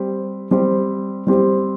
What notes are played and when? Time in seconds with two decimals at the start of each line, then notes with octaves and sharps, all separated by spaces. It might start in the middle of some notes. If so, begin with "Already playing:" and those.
Already playing: G3 C4 G4 C5
0.51 G3 C4 G4 C5
1.27 G3 C4 G4 C5